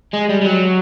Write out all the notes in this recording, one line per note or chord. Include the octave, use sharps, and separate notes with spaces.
G#3
G3
G3
F#3